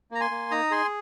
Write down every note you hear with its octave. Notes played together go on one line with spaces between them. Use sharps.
A#3 A#5
G#5 C6
A#3
D#4 A#5 D#6
G#4 G#5 C6